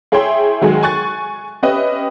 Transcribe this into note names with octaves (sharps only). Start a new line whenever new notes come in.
E4 G#4 C#5 E5 G5 C6
D#3 F#3 G#3 G#4
G#5 C#6 F#6 A6
C#4 G4 B4 D#5 E5